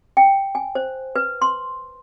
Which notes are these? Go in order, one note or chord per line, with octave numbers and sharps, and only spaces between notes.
G5
G#5
C5
B4
C6